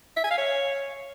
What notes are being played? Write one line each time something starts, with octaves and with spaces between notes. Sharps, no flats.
E5
G#5
F5
C#5